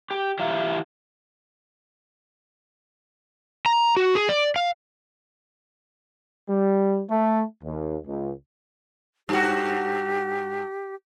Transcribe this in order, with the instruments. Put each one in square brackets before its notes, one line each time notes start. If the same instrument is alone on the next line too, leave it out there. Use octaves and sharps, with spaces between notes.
[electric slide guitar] G4
E3 F4 G4 E5 F5 A#5
A#5
F#4
G#4
D5
F5
[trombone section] G3
A3
D#2
C#2
[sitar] G2 F#4 [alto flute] G4